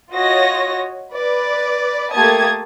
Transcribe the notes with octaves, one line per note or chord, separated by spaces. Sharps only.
F4 F#4 C#5 D#5 A#6
B4 D5
A3 A#3 G4 A5 D#6 G#6